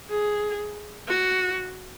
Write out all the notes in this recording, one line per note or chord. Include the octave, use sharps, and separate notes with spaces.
G#4
F#4